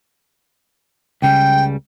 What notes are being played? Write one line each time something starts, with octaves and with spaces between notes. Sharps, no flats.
C#2 C#3 G3 G5